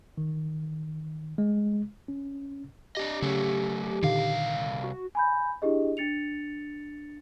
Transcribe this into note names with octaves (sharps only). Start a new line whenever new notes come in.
D#3
G#3
C#4
D4 G4 D#5
C#3 F#3 A3
C2 A#2 D3 D#3 F5
F#4
G#5 B5 G6
D4 E4 G4 G#4 D#5
D4 A6 C#7 F7